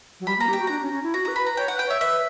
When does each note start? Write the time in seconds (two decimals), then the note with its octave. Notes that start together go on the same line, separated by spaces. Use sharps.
0.20 F#3
0.27 G3 B5
0.38 A#3 A#5
0.48 G4
0.53 G5
0.60 F#4
0.67 D4 A#5
0.82 C#4
0.92 C#4
1.03 E4
1.14 F#4 A#5
1.25 A#5
1.28 B4
1.36 B5
1.43 B4 A#5
1.57 C#5 G5
1.68 F#5
1.72 B4
1.79 G5
1.86 C#5 E5
2.01 B4 E5